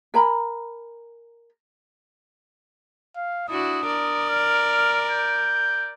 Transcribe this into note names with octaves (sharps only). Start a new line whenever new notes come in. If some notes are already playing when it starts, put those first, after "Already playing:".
A#4 G#5 A#5 B5
F5
D4 E4 F#4 D#6
A#4 D5
F6
G6